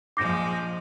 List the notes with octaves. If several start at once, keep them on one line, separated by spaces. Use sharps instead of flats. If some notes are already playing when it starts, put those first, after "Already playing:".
A#1 F3 G#3 D6 G6 A#6 C7